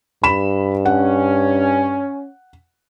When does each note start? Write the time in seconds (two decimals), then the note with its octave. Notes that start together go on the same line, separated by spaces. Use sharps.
0.23 G2 B5 E7
0.86 C#4 F#5